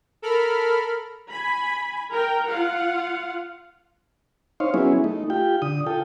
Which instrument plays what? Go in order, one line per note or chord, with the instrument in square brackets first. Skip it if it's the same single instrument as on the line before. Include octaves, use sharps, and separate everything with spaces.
[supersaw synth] A4 A#4 B5 F6
[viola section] G#5 B5
A#4 G5
F4 F5 F#5
[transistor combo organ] D#4 C5 C#5 F5
F#3 B3 C#4 E4 G#4
A3 D#4
F4 G4 G5
D3 D#6
F4 A4 G5